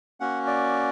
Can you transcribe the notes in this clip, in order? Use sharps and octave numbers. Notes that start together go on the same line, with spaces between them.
A#3 C#4 F#4 F#5
D5